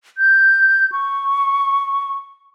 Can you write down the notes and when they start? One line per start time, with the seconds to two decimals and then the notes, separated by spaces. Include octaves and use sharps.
0.18 G6
0.92 C#6